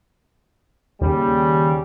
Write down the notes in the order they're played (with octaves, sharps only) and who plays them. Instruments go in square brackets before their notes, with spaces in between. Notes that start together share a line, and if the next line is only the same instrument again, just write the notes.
[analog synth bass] D#2 [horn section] C#3 G3